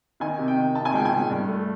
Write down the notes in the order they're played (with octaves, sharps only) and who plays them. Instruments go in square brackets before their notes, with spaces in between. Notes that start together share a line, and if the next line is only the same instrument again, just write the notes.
[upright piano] D#3 G#5
C3
G5
D#3
C3 A5
G#5
C#2 G5
G#5
C#2
G2
A3